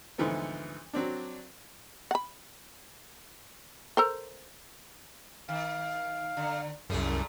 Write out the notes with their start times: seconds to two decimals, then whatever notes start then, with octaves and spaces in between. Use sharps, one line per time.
0.18 D2 G#2 E3 F3 A3 B3
0.93 F#3 C4 D4
2.11 F#5 B5
3.97 A4 A#4 C5
5.49 D#3 F5
6.37 D3
6.90 C2 F#2 A#2 A3 G#4